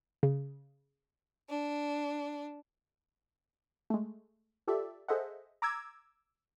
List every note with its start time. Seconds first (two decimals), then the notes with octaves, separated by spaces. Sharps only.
0.23 C#3
1.49 D4
3.90 G#3 A3
4.67 F4 G4 A4 D5 E5
5.08 G#4 A4 C5 D#5 E5 F#5
5.62 A#5 D6 E6 G#6